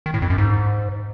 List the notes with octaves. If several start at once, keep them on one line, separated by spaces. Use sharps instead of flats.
D#3
A2
F2
F#2
G#2